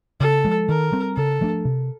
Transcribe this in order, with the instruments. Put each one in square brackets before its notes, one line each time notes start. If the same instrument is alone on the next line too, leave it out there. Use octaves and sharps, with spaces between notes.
[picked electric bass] C#3 [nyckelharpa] A4
[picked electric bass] F3 G#3
[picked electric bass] D#3 [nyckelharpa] A#4
[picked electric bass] G3 C4
[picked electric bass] C#3 [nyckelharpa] A4
[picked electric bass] F3 A3 D4
C3